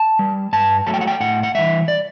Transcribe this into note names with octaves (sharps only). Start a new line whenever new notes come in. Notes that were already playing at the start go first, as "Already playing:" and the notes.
Already playing: A5
G3
G2 A5
F#3 A3 A5
G5
F#5
G5
A2 F#5
F#5
E3 G3 E5
D5